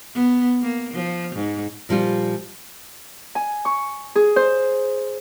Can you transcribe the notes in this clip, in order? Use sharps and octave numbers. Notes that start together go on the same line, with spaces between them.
B3
A#3
F3
G#2
A#2 F3 G3 F4
G#5
C#6
G#4
C5